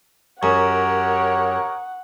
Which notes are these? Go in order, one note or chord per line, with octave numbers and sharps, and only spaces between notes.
F#2 G4 A#4 C#5 F#5 A#5 C#6 D#6